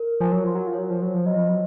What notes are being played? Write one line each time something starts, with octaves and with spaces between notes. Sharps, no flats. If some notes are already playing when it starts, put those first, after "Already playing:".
Already playing: A#4
F3 G#5
F#3
F3 C6
F#3
F3
F#3 C#5
F3
F#3 C5
F3
F#3 D#5
F3
F#3